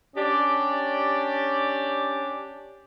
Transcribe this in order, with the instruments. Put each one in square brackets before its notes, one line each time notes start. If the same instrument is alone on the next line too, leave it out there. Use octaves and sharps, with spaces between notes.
[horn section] C#4 D4 G4 D5